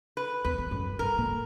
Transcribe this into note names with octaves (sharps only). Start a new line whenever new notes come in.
B4
E2 B4
E2
F#2
G2 A#4
A#2